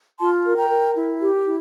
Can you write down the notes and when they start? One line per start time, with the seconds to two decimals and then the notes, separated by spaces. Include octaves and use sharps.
0.19 F4 A5 C6
0.44 A#4
0.56 G5 A#5
0.69 A#4
0.95 E4
1.20 G4
1.45 E4